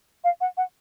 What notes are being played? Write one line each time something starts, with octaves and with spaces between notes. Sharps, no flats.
F5
F#5
F#5